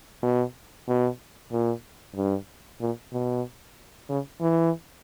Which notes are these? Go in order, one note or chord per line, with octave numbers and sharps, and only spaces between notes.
B2
B2
A#2
G2
A#2
B2
C#3
E3